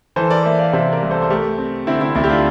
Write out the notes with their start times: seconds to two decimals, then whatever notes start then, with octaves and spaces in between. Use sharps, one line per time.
0.16 E3 A4 C5
0.30 A#4 D5
0.44 A#3 C5 E5
0.59 D5 F5
0.73 C3 C5 E5
0.92 A#4 D5
1.02 C2
1.11 A4 C5
1.22 C5
1.30 A3 G4 A#4
1.58 C4
1.87 D3 C4 E4
2.01 C4 E4
2.15 D2 C4 E4
2.24 G4
2.29 D4 F4